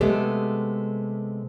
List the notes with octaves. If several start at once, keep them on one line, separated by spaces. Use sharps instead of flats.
C3 G#3 A3 B3 G4 A4